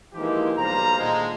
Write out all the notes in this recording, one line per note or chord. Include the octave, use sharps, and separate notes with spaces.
E3 F3 G#3 A#3 D#4 G4
B1 G3 C5 F5 A#5
A#2 D3 D#3 G#3